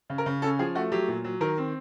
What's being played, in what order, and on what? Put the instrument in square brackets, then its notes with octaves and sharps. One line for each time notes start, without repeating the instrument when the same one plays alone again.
[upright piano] C#3
A#4
C#3
C#4 A4
F3 G#4
A3 F#4
F#3 G4
A#2
F#3
D#3 A#4
C4